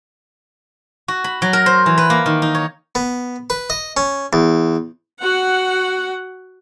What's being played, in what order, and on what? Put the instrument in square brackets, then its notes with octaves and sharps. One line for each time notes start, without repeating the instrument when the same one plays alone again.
[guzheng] F#4
B5
F#3
A#4
C5
E3
B4
A#3
D#3
D#4
C#5
[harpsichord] B3
B4
D#5
C#4
E2
[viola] F#4 F#5